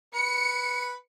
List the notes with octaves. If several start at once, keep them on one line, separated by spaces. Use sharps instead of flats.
B4 C#7